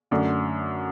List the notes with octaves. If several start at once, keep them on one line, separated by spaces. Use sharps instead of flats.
F#2 D3 A3 D4